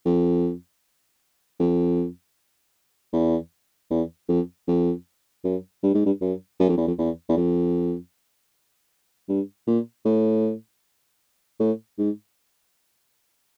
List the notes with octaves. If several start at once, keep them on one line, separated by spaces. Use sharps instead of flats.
F2
F2
E2
E2
F2
F2
F#2
G2
G#2
G2
F#2
F#2
F2
E2
F2
E2
E2
F2
G2
A#2
A2
A2
G#2